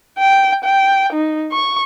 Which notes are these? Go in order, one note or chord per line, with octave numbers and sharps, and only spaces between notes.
G5
G5
D#4
C#6